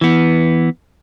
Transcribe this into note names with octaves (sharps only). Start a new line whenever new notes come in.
E3 B3